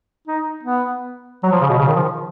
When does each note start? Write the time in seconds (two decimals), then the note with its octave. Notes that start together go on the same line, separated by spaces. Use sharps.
0.28 D#4
0.63 B3
1.43 F#3
1.52 F3
1.61 C#3
1.69 B2
1.79 C#3
1.88 D#3
1.96 F3